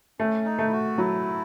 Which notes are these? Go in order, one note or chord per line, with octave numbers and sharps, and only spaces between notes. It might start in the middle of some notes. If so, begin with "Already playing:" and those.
A3 C#4
D#4
A3
E4
F#4
F#3 E4